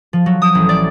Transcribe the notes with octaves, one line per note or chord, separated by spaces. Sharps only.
F3
F#3
D#6
A1
D5